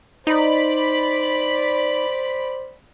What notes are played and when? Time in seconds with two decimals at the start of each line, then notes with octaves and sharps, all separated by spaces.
0.27 D#4 C5 D5 B5 B6